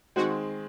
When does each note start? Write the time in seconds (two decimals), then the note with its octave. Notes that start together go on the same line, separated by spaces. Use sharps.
0.16 D#3 G#3 C4 F#4